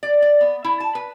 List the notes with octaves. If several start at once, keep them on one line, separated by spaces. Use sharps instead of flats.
D5
D5
B3
E4
A5
B4